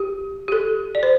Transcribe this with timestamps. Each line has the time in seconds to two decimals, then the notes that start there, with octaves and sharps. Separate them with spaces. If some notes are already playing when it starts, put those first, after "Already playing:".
Already playing: G4
0.48 G4
0.52 A4
0.95 D5
1.03 C5